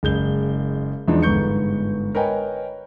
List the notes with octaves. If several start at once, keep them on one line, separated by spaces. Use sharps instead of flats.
F#1 G#3 G6 G7
E2 E3 F3 G#3 D4 D#4
G1 G#2 B3 C#6 G6 C#7
A#4 B4 C#5 D#5 G5 G#5